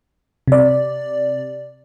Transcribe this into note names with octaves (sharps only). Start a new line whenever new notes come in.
C3 D5